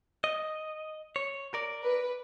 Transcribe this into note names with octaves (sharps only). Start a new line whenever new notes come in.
D#5
C#5
A#4 D5
B4